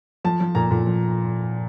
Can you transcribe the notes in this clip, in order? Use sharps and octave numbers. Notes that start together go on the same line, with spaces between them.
F3 A5
F3
A#2 A#5
A#2
F3